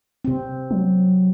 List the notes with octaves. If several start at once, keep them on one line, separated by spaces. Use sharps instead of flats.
C3 C4
F#3